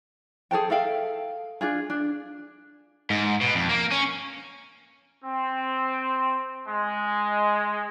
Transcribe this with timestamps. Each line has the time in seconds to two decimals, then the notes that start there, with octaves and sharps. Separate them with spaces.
0.51 G#4 A4 C5 G5
0.70 A4 E5 F5 G5
1.61 D4 F4 G#4
1.90 D4
3.10 G#2
3.41 B2
3.55 F2
3.69 A#3
3.92 C#4
5.25 C4
6.68 G#3